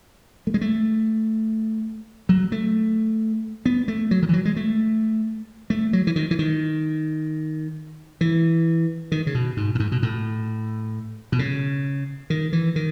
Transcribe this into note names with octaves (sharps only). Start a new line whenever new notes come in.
A3
G#3
A3
F#3
A3
B3
A3
F#3
D#3
E3
F#3
G#3
A3
A3
F#3
E3
D#3
E3
D#3
E3
D#3
C#3
B2
G#2
A2
G#2
B2
A2
B2
C#3
D#3
E3
D#3